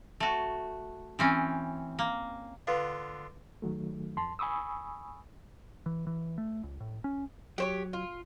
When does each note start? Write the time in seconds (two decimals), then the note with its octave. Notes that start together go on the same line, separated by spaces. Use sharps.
0.20 A3 F#4
1.19 E3 C4 C#4
1.99 A#3
2.67 D3 B3 F4 B4 F5
3.62 D#3 F#3 A3
4.17 F2 A5 C6
4.39 G#5 B5 C#6 D#6 E6
5.86 E3
6.07 E3
6.38 A3
6.63 C#2
6.80 A2
7.04 C#4
7.58 F#3 G4 C5 C#5
7.93 F4